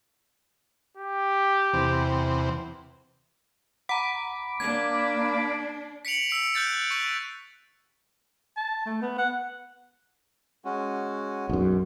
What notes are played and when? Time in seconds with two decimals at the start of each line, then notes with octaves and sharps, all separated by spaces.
0.97 G4
1.73 E2 C3
3.89 F#5 A#5 B5 D6
4.60 A#3 D4 G#6
6.05 B6 C#7 D7 F7 F#7
6.29 E6 C7 D7
6.54 F#6 G6 A6 D7
6.91 C#6 B6
8.57 A5
8.86 A3
9.02 B3
9.18 F#5
10.65 G#3 C#4 F#4
11.49 B1 F#2 G#3